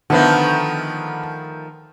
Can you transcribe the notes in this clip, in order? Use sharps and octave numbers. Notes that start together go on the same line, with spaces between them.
D3 D#3 F3 A3 B3